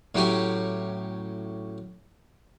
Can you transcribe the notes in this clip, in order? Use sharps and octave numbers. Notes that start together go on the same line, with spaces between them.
A2 F#3 C#4 G4 G#5